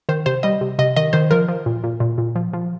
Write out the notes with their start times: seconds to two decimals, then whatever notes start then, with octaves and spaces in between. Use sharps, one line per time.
0.09 D#3 C5
0.26 C3 C5
0.43 G3 D#5
0.61 C3
0.79 C3 D#5
0.96 D#3 D#5
1.13 D#3 C5
1.31 F3 A#4
1.48 F3
1.66 A#2
1.84 A#2
2.00 A#2
2.18 A#2
2.36 F3
2.53 F3